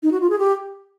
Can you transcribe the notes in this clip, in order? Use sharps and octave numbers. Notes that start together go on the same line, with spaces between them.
D#4
F#4
F4
G#4
G4